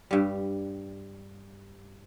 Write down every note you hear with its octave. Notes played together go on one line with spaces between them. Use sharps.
G2 G3